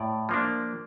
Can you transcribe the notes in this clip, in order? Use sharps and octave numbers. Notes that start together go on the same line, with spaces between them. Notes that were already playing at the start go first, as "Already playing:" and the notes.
Already playing: A2 D5
F3 A#3 D4